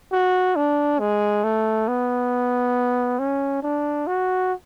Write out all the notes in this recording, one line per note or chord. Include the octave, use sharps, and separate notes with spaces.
F#4
D4
G#3
A3
B3
C#4
D4
F#4